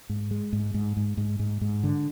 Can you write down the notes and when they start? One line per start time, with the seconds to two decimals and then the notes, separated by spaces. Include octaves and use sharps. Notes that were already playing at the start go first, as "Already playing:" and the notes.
0.09 G#2
0.31 G#3
0.53 G#2
0.74 G#2
0.97 G#2
1.17 G#2
1.39 G#2
1.61 G#2
1.83 D3